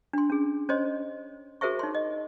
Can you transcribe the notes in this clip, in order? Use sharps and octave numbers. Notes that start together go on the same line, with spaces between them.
D4 C6
C#4 G#4
C#4 C5 C#5 D#5 C6
F#4 G#4 A#4 C5 E5 C#6
D#4 C#5 C6
D#5